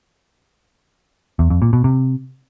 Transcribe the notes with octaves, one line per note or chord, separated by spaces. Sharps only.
E2
F2
A#2
B2
C3